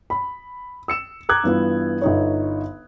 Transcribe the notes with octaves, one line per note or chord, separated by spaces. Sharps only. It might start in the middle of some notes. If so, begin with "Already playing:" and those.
B5
E6 C#7 E7
A#5 D6 F#6 G#6
G2 E3 B3 F4
G1 D#4 C#5